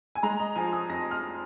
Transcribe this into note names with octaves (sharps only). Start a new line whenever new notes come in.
G#5
G#3 A#5
D#5
F3 G#5
D#6
F2 A#6
F6